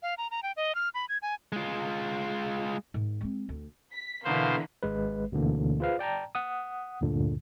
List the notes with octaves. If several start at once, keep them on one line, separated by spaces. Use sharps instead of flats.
F5
A#5
A#5
G5
D#5
F6
B5
G#6
G#5
G#3 F4
G#2 D#3
G#3 C4
D2
B6
B2 D3 E3 A#3 C5 F5
G#1 G#3 B4
D2 B2 D3 E3 A#3
F4 G#4 B4 C5 F5
D5 G5 A5 A#5
F#5 D#6
D2 G2 A#2 D3